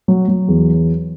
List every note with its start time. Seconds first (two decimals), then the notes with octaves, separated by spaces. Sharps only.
0.08 F#3
0.28 F#3
0.48 E2